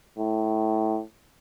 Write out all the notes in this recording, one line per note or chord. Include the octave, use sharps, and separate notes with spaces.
A2